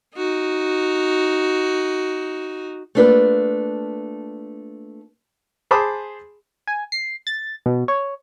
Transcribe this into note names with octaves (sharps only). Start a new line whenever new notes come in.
D#4 F#4
A3 A#3 D4 F4 B4
G#4 C5 A5 B5 D6 D#6
G#5
C7
A6
B2
C#5